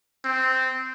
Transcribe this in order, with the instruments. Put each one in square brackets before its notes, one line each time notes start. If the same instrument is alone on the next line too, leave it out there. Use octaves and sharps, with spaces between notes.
[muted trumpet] C4